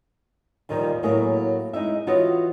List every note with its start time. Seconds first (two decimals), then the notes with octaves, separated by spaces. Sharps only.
0.69 D#2 A#2 D#3 F3 G3
1.03 A2 F#3 A#3 E4 G#4
1.73 G#3 D#4 E4 E5
2.07 E3 F4 F#4 C#5 D#5